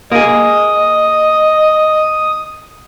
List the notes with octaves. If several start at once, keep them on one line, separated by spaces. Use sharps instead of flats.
A#3 G#4 D#5 D#6